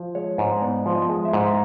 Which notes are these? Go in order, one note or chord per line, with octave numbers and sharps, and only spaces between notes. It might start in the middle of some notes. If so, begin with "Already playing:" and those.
Already playing: F3
G#3 C#5
G#2
B3 D5
F3
D#5
G#3
E5
G#2